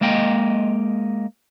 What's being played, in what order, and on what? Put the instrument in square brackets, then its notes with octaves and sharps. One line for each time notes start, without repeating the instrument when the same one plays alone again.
[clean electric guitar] G#3 A#3 D#5 G5